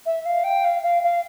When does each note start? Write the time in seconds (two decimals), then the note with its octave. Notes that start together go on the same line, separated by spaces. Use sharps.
0.05 E5
0.25 F5
0.43 G5
0.64 F5
0.82 F5
1.02 F5